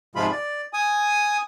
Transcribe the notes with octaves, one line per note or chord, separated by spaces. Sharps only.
G#2 C3 F3 G#3 F4 B5
D5
G#5 D#6